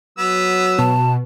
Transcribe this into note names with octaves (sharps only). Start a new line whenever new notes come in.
F#3 B3 E6
B2 A5